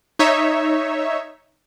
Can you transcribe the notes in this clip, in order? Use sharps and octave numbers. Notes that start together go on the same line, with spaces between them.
D#4 C#5 E5